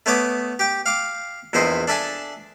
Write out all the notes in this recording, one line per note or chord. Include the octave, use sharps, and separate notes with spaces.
A3 B3 C#5 D6 D#6
G4 G5
F5 D6
A#1 E2 E4 C5 D#5 C6
D4 A4 E5 G#5